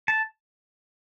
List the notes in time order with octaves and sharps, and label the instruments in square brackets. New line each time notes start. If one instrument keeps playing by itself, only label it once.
[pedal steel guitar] A5